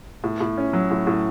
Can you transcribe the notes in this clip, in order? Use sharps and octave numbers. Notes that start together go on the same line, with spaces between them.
A2
A2
C#4
F#3
A2
A2